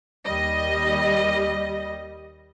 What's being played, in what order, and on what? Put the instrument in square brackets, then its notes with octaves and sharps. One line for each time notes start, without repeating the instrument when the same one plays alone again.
[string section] D#2 G3 D#5